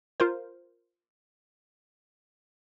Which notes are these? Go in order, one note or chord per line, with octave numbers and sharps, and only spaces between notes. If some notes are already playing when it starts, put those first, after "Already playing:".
F4 A#4 C5